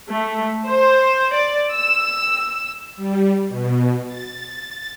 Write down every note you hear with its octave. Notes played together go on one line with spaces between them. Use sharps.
A3
C5
D5
E6
G3
B2
A6